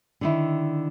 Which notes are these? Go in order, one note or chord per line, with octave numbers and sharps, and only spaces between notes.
D3 D#3 E4